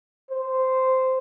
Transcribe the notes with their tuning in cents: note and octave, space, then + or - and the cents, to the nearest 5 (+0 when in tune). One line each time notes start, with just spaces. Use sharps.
C5 -10